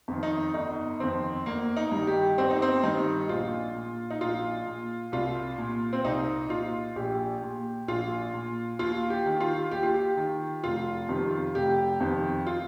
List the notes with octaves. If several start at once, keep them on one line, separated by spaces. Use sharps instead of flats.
F2 D#3
D#4
G1 D#4
F2 D#3 C4
G1 A#3
D#4
G2 D#3
G4
G1 C4
D#4
C4
G2 D#3 D#4
A#1 F4
A#2
D#4
A#1 F4
A#2
C2 F4
A#2
C4
C2 D#4
A#2 F4
A#1 G4
A#2
A#1 F4
A#2
D#2 F4
G4
D#3
F4
D#2 G4
F4
G4
D#3
F1 F4
F2 C3 D#3
F1 G4
F2 C3 D#3
F4